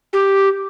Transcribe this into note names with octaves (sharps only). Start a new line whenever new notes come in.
G4